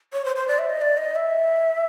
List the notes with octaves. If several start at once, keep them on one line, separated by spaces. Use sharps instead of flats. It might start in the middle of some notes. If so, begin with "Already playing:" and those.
C#5
C5
C5
D5
E5
D#5
D5
D#5
E5